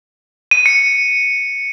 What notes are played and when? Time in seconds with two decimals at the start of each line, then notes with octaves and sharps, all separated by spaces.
0.51 D#7
0.66 C#7